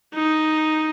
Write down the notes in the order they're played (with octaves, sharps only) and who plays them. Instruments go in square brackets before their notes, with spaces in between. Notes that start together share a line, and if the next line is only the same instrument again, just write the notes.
[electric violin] D#4